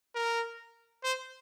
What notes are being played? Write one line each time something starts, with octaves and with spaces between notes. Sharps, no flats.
A#4
C5